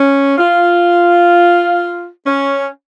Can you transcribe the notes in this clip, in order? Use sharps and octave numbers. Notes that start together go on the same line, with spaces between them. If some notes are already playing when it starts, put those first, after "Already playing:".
Already playing: C#4
F4
C#4